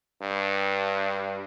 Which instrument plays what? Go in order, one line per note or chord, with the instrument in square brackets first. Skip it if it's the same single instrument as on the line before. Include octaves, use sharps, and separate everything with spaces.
[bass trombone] G2